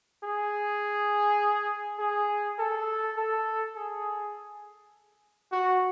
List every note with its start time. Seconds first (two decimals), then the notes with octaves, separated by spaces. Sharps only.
0.23 G#4
1.99 G#4
2.59 A4
3.17 A4
3.76 G#4
5.52 F#4